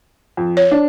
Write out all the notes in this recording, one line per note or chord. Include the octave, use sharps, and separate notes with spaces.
F2
C#5
D4